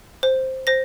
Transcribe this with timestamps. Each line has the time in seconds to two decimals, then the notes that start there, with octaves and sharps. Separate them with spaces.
0.23 C5
0.67 C5 A#6